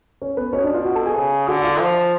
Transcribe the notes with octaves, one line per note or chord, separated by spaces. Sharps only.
C#4 C#5
B3 B4
B2 C#4 C#5
D4 D5
F4 F5
F#4 F#5
A4 A5
G#4 G#5
C#3
D3 F#4 F#5
F4 F5
F3